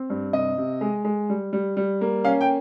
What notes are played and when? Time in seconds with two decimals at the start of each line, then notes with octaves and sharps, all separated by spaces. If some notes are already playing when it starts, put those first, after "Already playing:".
Already playing: C4
0.10 G2
0.33 C3 D#5
0.58 C3
0.81 G#3
1.05 G#3
1.30 G3
1.53 G3
1.77 G3
2.01 A#3
2.24 C#4 F5
2.41 G5